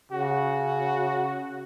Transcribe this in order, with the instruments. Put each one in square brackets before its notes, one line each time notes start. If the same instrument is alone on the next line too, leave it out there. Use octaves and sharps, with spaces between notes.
[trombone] C#3 [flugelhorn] F#4